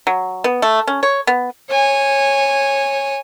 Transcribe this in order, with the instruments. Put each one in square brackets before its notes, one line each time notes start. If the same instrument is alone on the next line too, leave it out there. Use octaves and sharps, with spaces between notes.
[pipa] F#3
B3
A3
C#4
C#5
B3
[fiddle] C#5 G#5